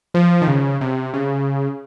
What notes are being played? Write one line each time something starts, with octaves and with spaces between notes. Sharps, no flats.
F3
D#3
C#3
C3
C#3